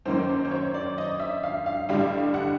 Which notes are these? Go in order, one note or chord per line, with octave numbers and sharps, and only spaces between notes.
F#2 D#3 F#3 A#3 C5
C5
C5
C#5
D5
D#5
E5
F5
F5
A1 G2 D3 G3 F5
F#5